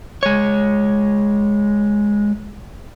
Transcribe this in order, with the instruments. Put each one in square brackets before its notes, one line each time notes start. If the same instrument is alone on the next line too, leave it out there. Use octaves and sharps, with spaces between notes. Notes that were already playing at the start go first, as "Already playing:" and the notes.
[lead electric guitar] G#3 C#5